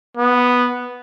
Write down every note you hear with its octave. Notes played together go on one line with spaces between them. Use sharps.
B3